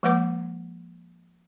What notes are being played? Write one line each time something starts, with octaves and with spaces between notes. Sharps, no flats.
F3 G#3 A#3 B4 F#5 D6